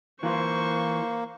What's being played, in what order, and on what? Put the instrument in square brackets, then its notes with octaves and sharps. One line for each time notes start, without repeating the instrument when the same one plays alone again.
[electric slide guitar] E3 F4 [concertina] A#3 [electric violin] C5 C#6